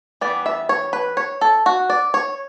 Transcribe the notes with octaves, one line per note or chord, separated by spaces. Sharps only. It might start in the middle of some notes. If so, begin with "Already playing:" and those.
E3 G3 B3 D5
E5
C#5
B4
C#5
A4
F#4
D5
C#5